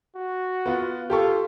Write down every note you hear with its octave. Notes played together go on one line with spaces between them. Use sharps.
F#4
B3 F4 B4
F4 G4 A4 C#6